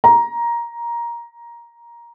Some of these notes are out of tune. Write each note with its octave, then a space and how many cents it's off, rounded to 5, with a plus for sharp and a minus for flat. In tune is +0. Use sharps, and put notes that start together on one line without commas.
A#5 +10